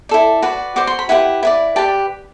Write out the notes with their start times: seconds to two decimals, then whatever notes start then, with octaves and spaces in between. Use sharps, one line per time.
0.09 E4 A4 D5
0.42 F#4 B4 D5
0.76 F#4 C5 D6
0.87 C6
0.99 B5
1.09 E4 G4 B4 F#5
1.43 E4 B4 D5
1.76 G4 B4 D5 A5